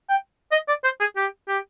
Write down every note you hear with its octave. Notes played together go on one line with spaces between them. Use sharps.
G5
D#5
D5
C5
G#4
G4
G4